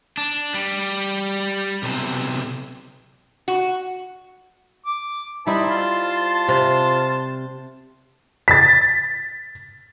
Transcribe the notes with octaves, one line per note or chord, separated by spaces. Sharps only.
D4
G3
B1 C3
F#4
D6
G3 D#4 E4 C5 E5 A5 B5
F4 C6
C3
A6 B6